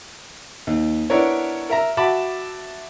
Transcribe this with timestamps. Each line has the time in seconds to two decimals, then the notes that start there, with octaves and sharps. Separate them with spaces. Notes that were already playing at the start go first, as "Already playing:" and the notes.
0.67 D#2
1.10 B3 D4 E4 A#4 C#5
1.70 A#4 E5 A#5
1.97 F#4 E5 A5 B5 D6